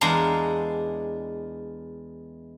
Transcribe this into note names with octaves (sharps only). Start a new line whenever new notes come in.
E2 G#3 D4 F5 A#5 C6